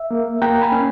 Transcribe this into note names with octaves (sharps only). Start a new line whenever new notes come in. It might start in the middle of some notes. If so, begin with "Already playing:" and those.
Already playing: E5
A#3
A#3 G5 A#5
G#5 B5
C#4